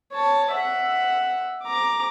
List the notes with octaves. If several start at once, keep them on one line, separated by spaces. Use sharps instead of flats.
C#5 A5
E5 F#5
A#5 D6